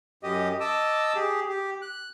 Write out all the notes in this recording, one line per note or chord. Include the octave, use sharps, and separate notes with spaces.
F#2 G4 D#5
D#5 A5 D6 E6
G4 G#4
G4
F#6